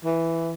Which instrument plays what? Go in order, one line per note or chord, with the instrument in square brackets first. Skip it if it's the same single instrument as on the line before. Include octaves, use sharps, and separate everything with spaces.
[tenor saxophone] E3